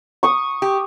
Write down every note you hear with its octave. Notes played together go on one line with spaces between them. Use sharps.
C#6 D#6
G4